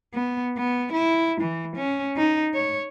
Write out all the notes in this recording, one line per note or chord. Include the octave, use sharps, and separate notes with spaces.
B3
B3
E4
E3
C#4
D#4
C#5